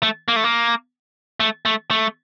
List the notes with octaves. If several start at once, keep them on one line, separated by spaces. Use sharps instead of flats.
A3
A#3
A3
A#3
A3
A3
A3